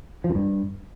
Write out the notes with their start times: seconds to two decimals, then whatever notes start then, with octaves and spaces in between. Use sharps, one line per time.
0.24 F3
0.30 F#2
0.35 G2